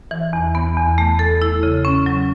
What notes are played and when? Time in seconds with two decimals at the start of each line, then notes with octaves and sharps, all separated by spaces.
0.11 E3
0.33 E2
0.55 B3
0.77 E2
0.98 A3
1.19 A4
1.42 E4
1.63 C#3
1.85 C#4
2.06 F#3